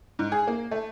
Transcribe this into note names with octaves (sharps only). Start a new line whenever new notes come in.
G#2
G#4
A#3
A3